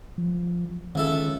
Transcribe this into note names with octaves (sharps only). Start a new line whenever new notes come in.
F3
C#2 D#3 E4 A4